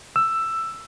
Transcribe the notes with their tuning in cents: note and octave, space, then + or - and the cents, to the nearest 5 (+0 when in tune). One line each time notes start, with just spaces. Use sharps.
E6 +10